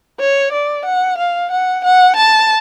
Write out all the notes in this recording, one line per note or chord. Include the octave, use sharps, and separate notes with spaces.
C#5
D5
F#5
F5
F#5
F#5
A5